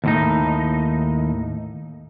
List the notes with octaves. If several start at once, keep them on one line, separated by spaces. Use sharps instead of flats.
D#2 A2 D#4